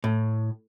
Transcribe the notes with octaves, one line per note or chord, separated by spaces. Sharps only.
A2